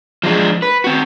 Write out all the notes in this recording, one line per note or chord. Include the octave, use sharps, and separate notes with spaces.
F3 G#3 D4 G#4
B4
C4 F#4